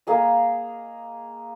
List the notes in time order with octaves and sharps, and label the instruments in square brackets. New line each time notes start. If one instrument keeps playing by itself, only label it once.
[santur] A#3 G#4 D#5